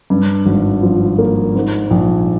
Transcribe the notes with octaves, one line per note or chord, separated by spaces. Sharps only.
G2
G#1
F3
A#3
G#2
A#1